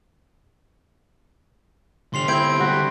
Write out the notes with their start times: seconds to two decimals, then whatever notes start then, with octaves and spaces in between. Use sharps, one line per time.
2.14 D3 G4 C6 C7 F7
2.28 C4 E4 G6 G#6 D7
2.59 G3 F#4